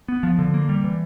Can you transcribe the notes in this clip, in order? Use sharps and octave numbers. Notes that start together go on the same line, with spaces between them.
B3
F3
D3
A#3
G3
E3